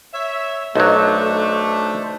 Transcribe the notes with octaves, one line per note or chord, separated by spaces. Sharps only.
C#5 E5
B1 F#3 A3 D4 D#4 C5